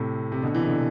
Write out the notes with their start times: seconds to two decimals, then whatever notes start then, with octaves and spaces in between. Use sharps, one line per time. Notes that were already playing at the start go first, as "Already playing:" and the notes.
Already playing: A2 C3
0.32 C3
0.42 B2 D3
0.54 C3 E3
0.67 B2 D3